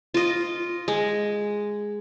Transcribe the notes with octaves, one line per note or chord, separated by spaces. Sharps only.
F4 D#5
G#3